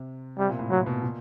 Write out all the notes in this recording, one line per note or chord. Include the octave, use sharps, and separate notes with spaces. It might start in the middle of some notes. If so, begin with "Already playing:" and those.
Already playing: C3
C3 G3
A#2
A2
A2 F#3
B2
A#2